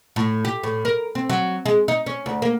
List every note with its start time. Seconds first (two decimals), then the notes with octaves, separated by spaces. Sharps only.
0.16 A2
0.45 G4
0.63 A2
0.85 A#4
1.15 C4
1.29 F#3
1.66 G#3
1.88 D#4
2.06 C#4
2.26 D2
2.42 A#3